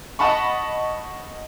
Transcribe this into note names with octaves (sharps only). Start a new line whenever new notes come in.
D#5 F#5 A5 B5 C#6